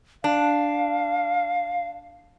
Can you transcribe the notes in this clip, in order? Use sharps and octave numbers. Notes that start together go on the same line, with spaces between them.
D4 F5